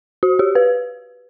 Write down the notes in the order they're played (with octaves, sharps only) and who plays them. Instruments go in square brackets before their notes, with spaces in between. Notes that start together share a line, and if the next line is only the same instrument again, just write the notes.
[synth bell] F#4
G4
B4